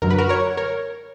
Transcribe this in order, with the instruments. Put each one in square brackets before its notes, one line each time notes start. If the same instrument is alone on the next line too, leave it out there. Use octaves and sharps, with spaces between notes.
[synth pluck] F#2 D3 F#3 A#4
B4
F#4 A#4
A#4 C#5
A#4 C#5